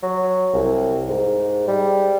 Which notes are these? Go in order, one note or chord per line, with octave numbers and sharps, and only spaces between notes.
F#3
C2
G#2
G3